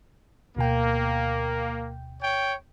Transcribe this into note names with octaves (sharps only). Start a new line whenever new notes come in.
D2 B2 A#3 G5
C#5 G5